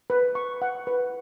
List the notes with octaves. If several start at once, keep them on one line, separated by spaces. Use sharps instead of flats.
B4
C#6
F#5
B4